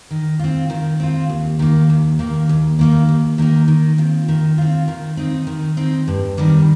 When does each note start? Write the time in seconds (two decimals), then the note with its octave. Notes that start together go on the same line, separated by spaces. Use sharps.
0.11 D#3
0.39 C4 F4
0.70 D#3
1.00 C4 F4
1.29 D#2
1.59 D#3 A#3
1.90 D#2
2.19 D#3 A#3
2.49 D#2
2.79 D#3 A#3 D#4
3.09 D#2
3.38 D#3 A#3 D#4
3.68 D#3
3.98 C4 F4
4.28 D#3
4.58 C4 F4
4.88 D#3
5.17 C4 D#4
5.47 D#3
5.77 C4 D#4
6.08 G2
6.37 D#3 G3 C4